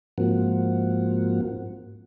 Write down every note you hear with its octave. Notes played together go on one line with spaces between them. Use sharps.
G#2 F3 A#3 C4 F#4